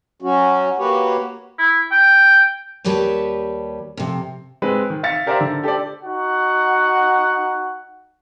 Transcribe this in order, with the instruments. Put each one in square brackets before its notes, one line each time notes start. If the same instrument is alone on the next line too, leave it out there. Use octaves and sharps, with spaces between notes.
[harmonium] F#3 C#4 F#4
A#3 F#4 G4 B4 C#5
[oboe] E4
G5
[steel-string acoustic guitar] D#2 G3 G4 B4 C#5 A5
F2 C3
[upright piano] G#3 C4 B4
D#3
E5 F5 A6 C#7
G4 A#4 C5 D5 E5 F5
D3
G4 A4 C5 D5
[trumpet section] D#4 F#4 F#5